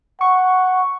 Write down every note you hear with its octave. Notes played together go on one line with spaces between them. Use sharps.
F#5 C#6